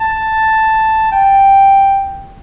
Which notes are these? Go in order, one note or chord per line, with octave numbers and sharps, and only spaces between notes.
A5
G5